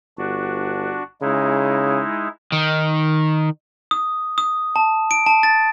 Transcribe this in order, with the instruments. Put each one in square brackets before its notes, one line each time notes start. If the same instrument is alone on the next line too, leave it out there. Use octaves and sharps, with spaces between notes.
[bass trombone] G1 [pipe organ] D4 F#4
[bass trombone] C#3 [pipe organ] G#3 D#4 E4
[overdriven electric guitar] D#3
[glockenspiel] D#6
D#6
A5
D7
A5
A6